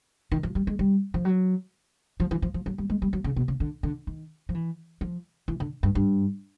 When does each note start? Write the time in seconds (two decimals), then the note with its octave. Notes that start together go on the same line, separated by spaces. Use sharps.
0.32 D#3
0.43 F3
0.55 G3
0.67 G#3
0.79 G3
1.14 F3
1.25 F#3
2.20 F3
2.31 E3
2.42 F3
2.54 F3
2.66 F#3
2.78 G3
2.90 G#3
3.02 G3
3.13 F#3
3.24 C#3
3.36 B2
3.48 C#3
3.60 D3
3.83 D3
4.07 D#3
4.49 F3
4.55 E3
5.01 F3
5.48 E3
5.60 D3
5.83 G2
5.95 G2